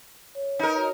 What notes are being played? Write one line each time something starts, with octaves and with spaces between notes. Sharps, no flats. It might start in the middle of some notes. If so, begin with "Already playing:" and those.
C#5
D#4 A#4 B4
F#4 C#5